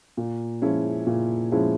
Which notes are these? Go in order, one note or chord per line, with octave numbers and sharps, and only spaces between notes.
A#2
F3 G#3 C#4 E4
A#2
F3 G#3 C#4 E4